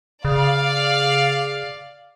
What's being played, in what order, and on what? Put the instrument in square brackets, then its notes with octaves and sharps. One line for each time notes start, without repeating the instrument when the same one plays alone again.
[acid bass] C#3 [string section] D5 F5